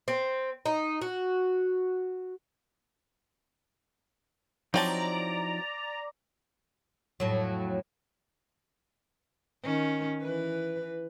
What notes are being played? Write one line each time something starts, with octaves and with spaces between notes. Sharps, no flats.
C4
D#4
F#4
F3 F#3 C4 D#4 E4 D5 A5 A#5
F2 A2 F#3
D#3 C#4
E3 B4